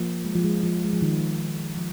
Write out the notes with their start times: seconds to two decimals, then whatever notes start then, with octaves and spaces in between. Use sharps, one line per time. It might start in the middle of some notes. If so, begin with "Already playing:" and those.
Already playing: F3 A#3
0.25 G#3
0.35 F3
0.44 G#3
0.63 F3
0.84 G#3
0.93 F3
1.02 D#3
1.77 F3